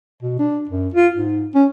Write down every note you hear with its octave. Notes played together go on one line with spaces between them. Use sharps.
B2
D4
F#2
F4
G#2
C#4